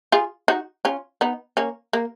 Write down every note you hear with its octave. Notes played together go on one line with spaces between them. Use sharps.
F4 G#4
D#4 F#4
C#4 F4
B3 D#4
A#3 C#4
A#3